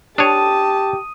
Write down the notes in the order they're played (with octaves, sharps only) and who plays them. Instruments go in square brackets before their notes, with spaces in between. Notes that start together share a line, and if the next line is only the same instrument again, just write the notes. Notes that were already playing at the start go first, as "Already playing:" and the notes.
[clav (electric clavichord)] D4 C#5 [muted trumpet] G4 [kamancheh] A5 [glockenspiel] D#6 D#7